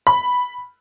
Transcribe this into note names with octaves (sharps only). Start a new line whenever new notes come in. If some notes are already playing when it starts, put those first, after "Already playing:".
B5